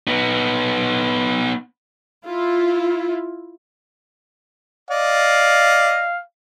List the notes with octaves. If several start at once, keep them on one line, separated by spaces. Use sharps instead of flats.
B3 D#4
E4 F4
D5 D#5 F5